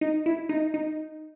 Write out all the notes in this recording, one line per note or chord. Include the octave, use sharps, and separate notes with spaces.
D#4
E4
D#4
D#4